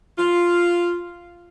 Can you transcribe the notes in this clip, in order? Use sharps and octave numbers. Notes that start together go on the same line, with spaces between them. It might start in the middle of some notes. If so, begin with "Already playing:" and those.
F4